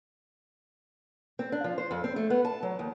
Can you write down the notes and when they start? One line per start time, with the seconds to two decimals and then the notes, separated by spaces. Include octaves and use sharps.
1.39 C4
1.52 D4
1.64 F3
1.78 C5
1.91 F2
2.04 C4
2.16 A3
2.30 B3
2.45 A5
2.63 F#3
2.79 D#2